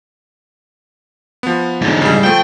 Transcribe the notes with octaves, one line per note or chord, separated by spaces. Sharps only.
F3 B3
G#2 D3
C#3 G3
F3 A3 G5